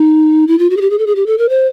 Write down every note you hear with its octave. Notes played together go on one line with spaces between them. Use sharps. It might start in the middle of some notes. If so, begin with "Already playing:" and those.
Already playing: D#4
E4
F4
F#4
G#4
G4
G#4
A4
G#4
G4
A4
A#4
C5